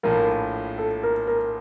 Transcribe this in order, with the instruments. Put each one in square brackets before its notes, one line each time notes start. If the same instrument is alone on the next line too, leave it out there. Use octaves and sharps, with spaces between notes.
[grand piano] A#1 A2 F3 [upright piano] A#4
[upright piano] A4
A#4
A#4